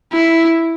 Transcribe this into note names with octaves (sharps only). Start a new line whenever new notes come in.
E4